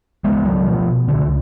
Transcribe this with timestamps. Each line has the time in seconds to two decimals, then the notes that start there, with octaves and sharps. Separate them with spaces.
0.24 C#2 G#3 B3
0.45 F#3 A3
0.66 B2 F3
1.08 C#2 D3